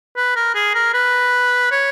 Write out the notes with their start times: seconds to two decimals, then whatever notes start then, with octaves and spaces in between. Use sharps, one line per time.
0.17 B4
0.36 A#4
0.55 G#4
0.75 A#4
0.94 B4
1.71 C#5